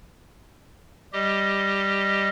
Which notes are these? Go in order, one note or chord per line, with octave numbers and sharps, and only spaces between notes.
G3 G4 D#5